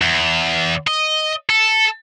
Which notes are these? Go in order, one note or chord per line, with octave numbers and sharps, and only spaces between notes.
E2
D#5
A4